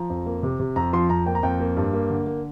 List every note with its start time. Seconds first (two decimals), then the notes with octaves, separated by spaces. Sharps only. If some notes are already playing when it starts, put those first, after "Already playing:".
Already playing: F3 A#5
0.10 F2
0.26 A#3
0.43 C3
0.60 C3
0.76 F2 A#5
0.93 F3 C6
1.10 F2 A#5
1.26 A#3 G5
1.35 A#5
1.43 F2 G5
1.60 A#3
1.77 G2
1.93 A#3
2.10 D3
2.27 A#3